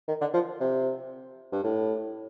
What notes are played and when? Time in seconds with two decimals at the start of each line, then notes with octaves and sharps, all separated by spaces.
0.08 D#3
0.21 D3
0.34 F3
0.60 C3
1.52 G2
1.64 A2